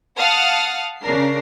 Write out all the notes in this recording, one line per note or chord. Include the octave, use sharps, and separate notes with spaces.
F5 F#5 A5 D#6 F6
C#3 D4 A#4 C7